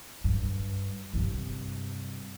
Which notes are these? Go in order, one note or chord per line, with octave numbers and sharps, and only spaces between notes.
G2
G2 C3